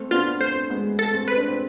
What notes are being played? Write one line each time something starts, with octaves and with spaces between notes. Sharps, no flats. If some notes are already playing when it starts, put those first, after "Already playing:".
Already playing: A3 C4
B3 D4 F4
A3 C4 C5
G#3 B3
A4
A3 C4
B4
D4
C4